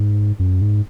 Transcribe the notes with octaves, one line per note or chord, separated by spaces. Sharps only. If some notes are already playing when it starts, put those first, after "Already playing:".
Already playing: G#2
F#2
G#2